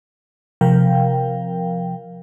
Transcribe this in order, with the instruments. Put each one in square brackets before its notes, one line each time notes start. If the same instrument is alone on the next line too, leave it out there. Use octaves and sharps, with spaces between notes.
[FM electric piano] C3 F3 A#4 F5 G5